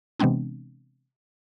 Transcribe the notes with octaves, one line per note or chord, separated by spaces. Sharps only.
C3 E3 G#3 B3 C4 D4